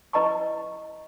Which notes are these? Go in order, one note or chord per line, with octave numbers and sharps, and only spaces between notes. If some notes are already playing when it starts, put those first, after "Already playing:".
E4 B4 D#5 A#5 B5 C#6